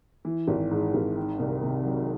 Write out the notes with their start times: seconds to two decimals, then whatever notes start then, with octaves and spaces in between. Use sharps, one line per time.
0.25 E3
0.48 G#1
0.71 G#2
0.94 G#1
1.16 D#3
1.39 C2
1.63 C3
1.86 F#3